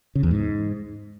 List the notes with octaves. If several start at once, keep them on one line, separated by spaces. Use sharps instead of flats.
C#3
E2
G#2